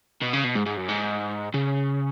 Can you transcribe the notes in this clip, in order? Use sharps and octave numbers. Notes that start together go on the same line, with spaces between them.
B2
C#3
B2
G#2
G#2
F#2
G#2
C#3